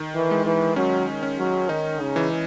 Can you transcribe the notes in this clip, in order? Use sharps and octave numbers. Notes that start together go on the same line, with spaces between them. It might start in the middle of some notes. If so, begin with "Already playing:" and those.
Already playing: D#3
E3
G#3
E3
F#3 C#4
C#4
F#3
D#3 D#4
C#3
E3